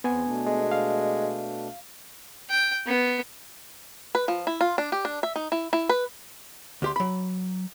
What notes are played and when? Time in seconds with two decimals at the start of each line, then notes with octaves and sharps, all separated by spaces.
0.04 E2 B3 C4 G#5
0.25 B2 A3 D4
0.46 G#3
0.71 F5
2.50 G5
2.87 B3
4.15 B4
4.28 F3
4.47 E4
4.61 F4
4.78 D4
4.92 G4
5.05 D4
5.23 E5
5.36 D#4
5.52 E4
5.73 E4
5.89 B4
6.82 D2 G4 C6
6.96 F#3 B5